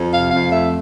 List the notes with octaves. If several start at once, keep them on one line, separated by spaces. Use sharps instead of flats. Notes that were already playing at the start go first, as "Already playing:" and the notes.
Already playing: F2
C3 F5
F2 F5
A3 E5